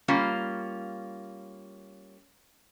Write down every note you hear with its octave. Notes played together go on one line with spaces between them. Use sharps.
G3 A#3 C#4 F4